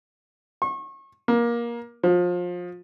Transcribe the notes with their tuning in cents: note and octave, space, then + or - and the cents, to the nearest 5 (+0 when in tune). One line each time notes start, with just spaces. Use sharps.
C#6 -35
A#3 +20
F3 +25